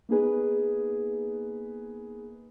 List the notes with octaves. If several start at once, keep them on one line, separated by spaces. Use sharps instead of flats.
A#3 B3 D#4 G#4 B4